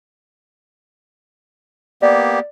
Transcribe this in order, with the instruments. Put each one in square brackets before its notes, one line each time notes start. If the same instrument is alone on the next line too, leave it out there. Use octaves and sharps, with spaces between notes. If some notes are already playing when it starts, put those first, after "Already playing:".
[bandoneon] A#3 B3 G4 [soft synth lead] D5